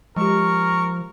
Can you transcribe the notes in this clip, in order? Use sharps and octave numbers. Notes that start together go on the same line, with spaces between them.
F3 G#3 G4 A#4 C#6